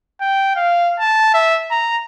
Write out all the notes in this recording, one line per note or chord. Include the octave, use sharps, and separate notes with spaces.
G5
F5
A5
E5
A#5